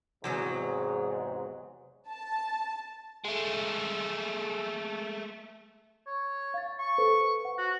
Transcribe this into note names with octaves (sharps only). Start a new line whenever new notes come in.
E2 G#2 C3 F#3 G#3
A5
G#3 A3
C#5
F5 A6
C#6
A4 B4 C5
F#5
F#4